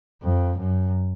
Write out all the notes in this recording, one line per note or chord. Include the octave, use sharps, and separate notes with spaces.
F2
F#2